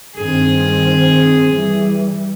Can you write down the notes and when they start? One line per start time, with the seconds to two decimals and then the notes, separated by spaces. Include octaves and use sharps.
0.16 G2 D#3 C4 G#4
1.53 E3 G3